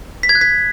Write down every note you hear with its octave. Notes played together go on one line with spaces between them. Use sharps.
B6
G#6
F#6
B6